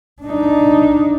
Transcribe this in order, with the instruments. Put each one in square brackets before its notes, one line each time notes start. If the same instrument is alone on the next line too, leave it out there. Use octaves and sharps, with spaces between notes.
[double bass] D4 D#4